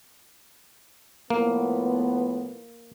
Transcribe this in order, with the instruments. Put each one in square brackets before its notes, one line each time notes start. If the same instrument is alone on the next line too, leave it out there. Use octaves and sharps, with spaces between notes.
[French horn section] A2 F3 B3 [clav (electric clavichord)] A#3